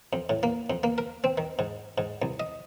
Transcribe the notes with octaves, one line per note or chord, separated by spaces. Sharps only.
F2
A2
A#3
F2
A#3
A#4
C4
D#3
G#2
G#2
C2
D#5